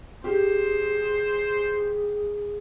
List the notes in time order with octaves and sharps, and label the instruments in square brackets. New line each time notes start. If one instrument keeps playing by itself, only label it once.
[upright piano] G4 [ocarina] G#4 [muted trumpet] C5